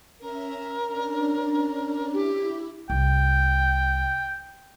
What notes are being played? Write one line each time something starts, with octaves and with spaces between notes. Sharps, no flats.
C#4 A#4 E5
C#4 D4
E4 G4
C2 G5